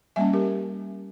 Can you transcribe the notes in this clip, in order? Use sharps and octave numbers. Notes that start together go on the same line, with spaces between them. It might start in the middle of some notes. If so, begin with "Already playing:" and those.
G3 A#3 C#4 E5 G#5
G4 A#4